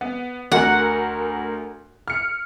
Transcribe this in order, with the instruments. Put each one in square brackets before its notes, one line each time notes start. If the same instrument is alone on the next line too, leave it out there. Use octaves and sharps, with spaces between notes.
[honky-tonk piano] B3
[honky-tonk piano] D2 F#4 A#4 [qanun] F#5
[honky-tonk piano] F6 C#7